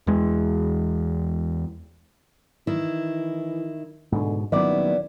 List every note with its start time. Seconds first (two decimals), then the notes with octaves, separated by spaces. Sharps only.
0.07 E2 G#3
2.67 D#3 E3 E4
4.12 G#2 B2 D3
4.52 D#1 D#3 F#3 B3 E4 D5